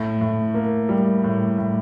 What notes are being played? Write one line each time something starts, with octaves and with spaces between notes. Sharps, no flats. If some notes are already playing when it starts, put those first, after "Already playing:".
Already playing: A2
A2
A#3
G3
A2
A2